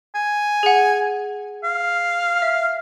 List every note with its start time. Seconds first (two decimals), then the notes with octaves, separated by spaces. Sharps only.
0.15 G#5
0.63 G#4 F#5
1.64 F5
2.42 E5